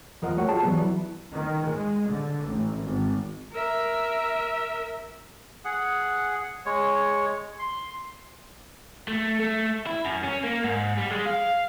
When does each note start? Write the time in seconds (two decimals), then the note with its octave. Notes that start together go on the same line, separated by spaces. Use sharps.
0.22 E2 F3 A#4 D#5 F#5
0.37 G3 A3 F#4 C#5 F#5 G5
0.48 F4 G#4 A5
0.63 E3 F#3 G3 B3
0.81 E4
1.32 D#3
1.65 G#3
2.09 D3
2.45 A1
2.82 G#1
3.52 A#4 E5
5.65 G#4 F#5
6.66 G#3 C#5
7.59 C6
9.08 A3
9.40 A3
9.87 E4
10.05 F#2
10.24 C#4
10.44 A#3
10.64 G#2
10.98 G3
11.11 G#3
11.26 F5